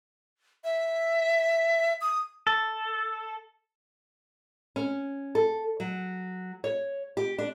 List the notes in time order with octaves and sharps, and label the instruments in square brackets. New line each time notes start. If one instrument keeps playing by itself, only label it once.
[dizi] E5
D#6
[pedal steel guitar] A4
[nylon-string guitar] C#4
A4
F#3
C#5
G4
D4